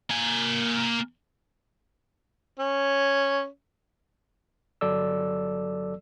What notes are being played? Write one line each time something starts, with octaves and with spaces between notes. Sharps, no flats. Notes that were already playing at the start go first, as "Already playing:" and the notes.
A#3 G#5
C#4
G1 F#3 A4 D5 E6